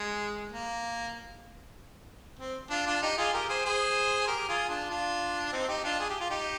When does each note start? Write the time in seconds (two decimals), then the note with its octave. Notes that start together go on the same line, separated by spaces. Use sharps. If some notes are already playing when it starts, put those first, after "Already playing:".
Already playing: G#3
0.52 A#3
2.39 C4
2.70 D4 F4
2.87 D4 F4
3.02 D#4 G4
3.17 F4 G#4
3.33 G4 A#4
3.49 G#4 C5
3.65 G#4 C5
4.27 G4 A#4
4.48 F4 G#4
4.69 D4 F4
4.90 D4 F4
5.53 C4 D#4
5.68 D#4 G4
5.84 D4 F4
6.00 G#4
6.10 G4
6.20 F4
6.30 D#4 G4